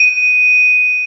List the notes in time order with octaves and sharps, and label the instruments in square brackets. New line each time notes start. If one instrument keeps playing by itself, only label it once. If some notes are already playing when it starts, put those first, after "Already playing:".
Already playing: [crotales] D#7